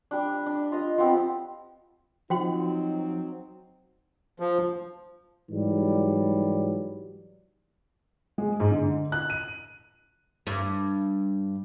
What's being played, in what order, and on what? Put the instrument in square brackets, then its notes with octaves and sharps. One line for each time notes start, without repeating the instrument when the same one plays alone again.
[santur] G3 D4
D4
F4 D#5 D#6
F3 B3 C4 G4
[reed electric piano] F3 [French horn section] F#3 C4 D#4 [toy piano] F#4 G5 C6
[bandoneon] F3
[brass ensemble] G#2 E3 F#3 G3
[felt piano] G#3
G#2
D3
F#6
D#7
[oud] G2